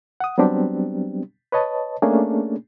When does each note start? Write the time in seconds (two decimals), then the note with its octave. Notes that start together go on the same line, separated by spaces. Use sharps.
0.20 F#5 D#6
0.38 F#3 G3 B3 C4 D4 G4
1.52 B4 C#5 D#5 A5
2.02 A3 A#3 C#4 D4 G#4